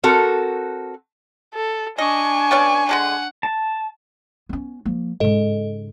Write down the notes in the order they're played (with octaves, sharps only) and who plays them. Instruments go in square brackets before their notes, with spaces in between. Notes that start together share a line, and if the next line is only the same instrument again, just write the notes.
[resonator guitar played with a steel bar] C4 F#4 A4 A#4
[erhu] A4
[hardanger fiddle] D4 C#6 [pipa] D#5 [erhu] G#5
[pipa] B3 C#4 D5
[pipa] D3 G#3 D4 [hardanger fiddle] F#5
[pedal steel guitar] A5
[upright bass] B3 C#4
F3 A#3
[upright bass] G#2 C#3 [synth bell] A4 D#5